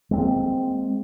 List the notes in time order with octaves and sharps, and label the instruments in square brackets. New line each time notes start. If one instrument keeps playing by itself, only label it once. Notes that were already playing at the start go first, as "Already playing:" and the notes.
[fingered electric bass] G#3 A#3 C4